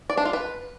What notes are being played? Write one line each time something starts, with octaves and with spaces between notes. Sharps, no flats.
D5
D4
F4
B4